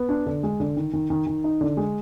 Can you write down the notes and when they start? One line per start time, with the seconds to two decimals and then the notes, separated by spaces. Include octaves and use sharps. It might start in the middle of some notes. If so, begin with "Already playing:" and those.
Already playing: B3
0.09 D4
0.26 D3
0.43 G#3
0.60 D3
0.77 D#3
0.93 D#3
1.10 D#3
1.27 D#3
1.44 D#4
1.61 D3
1.77 G#3